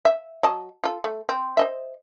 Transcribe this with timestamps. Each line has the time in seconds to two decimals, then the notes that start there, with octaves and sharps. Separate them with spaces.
0.05 E5
0.43 F#3 D#5 A5
0.84 F4 A4
1.04 A3
1.29 C4
1.57 C5 D#5 E5